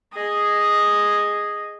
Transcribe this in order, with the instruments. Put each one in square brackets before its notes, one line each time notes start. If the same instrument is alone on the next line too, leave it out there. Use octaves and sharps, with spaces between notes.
[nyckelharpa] G#4 D#5